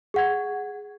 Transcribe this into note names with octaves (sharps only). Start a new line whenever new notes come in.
G#4 F#5 G#6